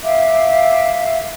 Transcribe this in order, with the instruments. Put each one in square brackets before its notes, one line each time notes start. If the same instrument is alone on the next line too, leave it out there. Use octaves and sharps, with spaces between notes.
[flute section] E5 F5 D6